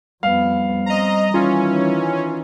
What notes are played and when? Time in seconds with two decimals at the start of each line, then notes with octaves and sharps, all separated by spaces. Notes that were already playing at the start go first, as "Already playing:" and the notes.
0.23 F2 G3 B3 F5
0.86 C4 D#5 A#5
1.34 D#3 E3 C#4 F4